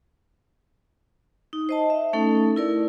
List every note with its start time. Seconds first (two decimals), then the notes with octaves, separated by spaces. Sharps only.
1.53 D#4
1.69 C5 D#5 A5
1.90 E5
2.13 A3 C#4 D#4 A4
2.56 E4 A#4 D5